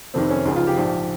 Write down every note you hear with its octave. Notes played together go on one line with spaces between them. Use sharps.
F1 F2 C3 D#3 C4
C#4
C#2 C#3 F3 D#4
F4
G4
A#1 G#2 F3